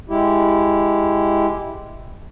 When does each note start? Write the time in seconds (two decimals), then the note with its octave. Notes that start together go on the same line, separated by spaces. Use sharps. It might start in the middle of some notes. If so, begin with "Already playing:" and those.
0.10 G#3 E4 G4